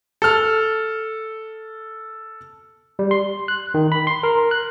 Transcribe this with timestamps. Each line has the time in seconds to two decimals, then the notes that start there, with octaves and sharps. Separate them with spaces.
0.22 A4 F6
2.99 G3
3.11 C6
3.48 F#6
3.74 D#3
3.92 B5
4.07 C6
4.23 A#4
4.51 F#6